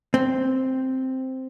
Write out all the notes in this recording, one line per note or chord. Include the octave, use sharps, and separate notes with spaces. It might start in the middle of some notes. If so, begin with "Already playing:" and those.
C4